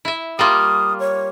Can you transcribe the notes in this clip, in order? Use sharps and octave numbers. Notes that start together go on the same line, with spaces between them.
E4 E5
G3 A#3 F4 D#6
C#5